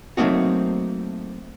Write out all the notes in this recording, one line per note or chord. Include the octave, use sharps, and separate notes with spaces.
F#3 A3 A#3 C4 D#4 F#4